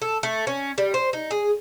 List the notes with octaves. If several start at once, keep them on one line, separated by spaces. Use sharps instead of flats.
A4
A3
C#4
G3
C5
D#4
G#4